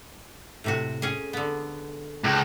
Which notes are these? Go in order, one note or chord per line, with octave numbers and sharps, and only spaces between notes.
A2 C3 F#4
C#4 G#4
D3 B3
C#2